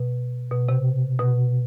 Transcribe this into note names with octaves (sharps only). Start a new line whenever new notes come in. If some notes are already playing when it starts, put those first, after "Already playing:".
Already playing: B2
B2
C3
B2